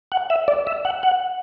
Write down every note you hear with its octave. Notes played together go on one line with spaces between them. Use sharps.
F#5
E5
D5
E5
F#5
F#5